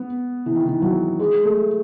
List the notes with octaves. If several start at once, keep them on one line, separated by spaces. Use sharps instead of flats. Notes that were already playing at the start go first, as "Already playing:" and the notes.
Already playing: B3
E3
D#3
E3
F#3
G#3
A3